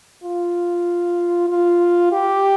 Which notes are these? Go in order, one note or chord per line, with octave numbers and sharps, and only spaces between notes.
F4
F4
G4